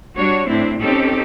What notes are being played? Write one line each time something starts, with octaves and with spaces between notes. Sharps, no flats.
G3 D4 F#4 C#5
A2 C4 D4 E4
C4 C#4 D#4 G4 A4